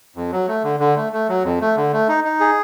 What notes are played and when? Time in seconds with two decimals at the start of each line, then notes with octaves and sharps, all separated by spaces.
0.16 F2
0.32 F#3
0.48 A3
0.64 D3
0.80 D3
0.96 A3
1.13 A3
1.28 F#3
1.44 F2
1.61 A3
1.77 D3
1.93 A3
2.08 D#4
2.24 D#4
2.40 G#4